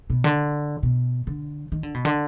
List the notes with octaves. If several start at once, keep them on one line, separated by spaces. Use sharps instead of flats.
B2
D3
B2
D3
D#3
D3
B2
D3